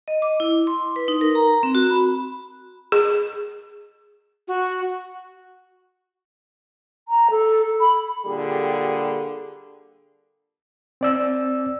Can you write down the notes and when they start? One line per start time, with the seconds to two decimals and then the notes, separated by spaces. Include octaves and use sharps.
0.08 D#5
0.22 D6
0.40 E4
0.67 C6
0.96 B4
1.08 D#4
1.21 A#4
1.35 A#5
1.63 C4
1.75 F#4
1.90 B5
2.92 G#4
4.48 F#4
7.08 A#5
7.31 A4
7.81 B5
8.26 A#2 D3 G3 G4 G#4
11.01 C4 D5 E6